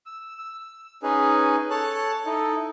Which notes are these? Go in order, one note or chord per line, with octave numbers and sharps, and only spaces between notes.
E6
E6
C#4 D#4 G#4 B4
A4 C#5 A5 F#6
D#4 E4 A4